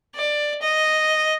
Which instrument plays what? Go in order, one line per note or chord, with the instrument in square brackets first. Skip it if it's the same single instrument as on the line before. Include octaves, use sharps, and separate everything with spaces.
[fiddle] D5
D#5